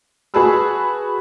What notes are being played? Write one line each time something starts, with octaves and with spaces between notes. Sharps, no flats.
F#4 G#4 B4 A5 B5 E6